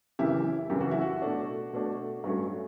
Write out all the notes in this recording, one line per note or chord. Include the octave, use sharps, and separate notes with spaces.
F#2 C#3 E3 E4 G4
F#2 C#3 E3 G4
F#4
E4
F#4
B2 A3 D4
B2 A3 D4
G2 F#3 A3 C#4